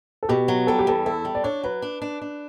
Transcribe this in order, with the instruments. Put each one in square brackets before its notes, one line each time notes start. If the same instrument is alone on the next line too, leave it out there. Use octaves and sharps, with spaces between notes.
[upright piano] A4
[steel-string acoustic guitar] B2 [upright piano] G4
[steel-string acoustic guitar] F#3
[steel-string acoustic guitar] G3 [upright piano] A4
[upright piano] G4
[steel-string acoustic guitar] E2 [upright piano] A4
[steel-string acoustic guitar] E4 [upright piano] A4
[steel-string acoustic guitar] G3
[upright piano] D5
[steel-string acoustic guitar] D4 [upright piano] C#5
[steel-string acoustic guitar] F#3 [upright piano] B4
[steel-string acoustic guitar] D4
D4
D4